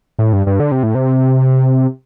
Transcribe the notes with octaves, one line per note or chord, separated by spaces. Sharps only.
A2
G2
G2
D3
C3
A2
C3